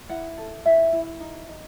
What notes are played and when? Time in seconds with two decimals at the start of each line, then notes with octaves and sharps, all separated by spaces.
0.09 E4 F#5
0.38 A4
0.66 E4 E5
0.92 E4
1.20 D#4
1.48 D#4